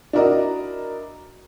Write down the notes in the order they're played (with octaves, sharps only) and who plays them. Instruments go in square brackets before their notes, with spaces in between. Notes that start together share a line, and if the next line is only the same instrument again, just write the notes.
[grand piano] D4 E4 F#4 A#4 D5 D#5